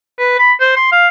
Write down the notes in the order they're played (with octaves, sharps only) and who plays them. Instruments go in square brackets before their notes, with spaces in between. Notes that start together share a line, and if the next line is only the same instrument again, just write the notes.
[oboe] B4
B5
C5
C6
F5